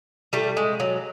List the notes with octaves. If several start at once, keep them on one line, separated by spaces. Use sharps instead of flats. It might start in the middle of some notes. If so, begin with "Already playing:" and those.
G3 A3
G#3
F#3